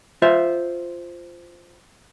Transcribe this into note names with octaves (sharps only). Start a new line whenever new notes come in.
F4 C5 E5